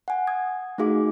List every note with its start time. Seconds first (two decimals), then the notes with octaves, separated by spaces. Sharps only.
0.08 F#5 G#5
0.27 D#6 G#6
0.78 A3 D#4 F#4 G#4 F5 D6